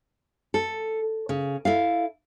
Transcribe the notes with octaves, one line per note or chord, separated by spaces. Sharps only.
A4
C#3
E4 A4 F5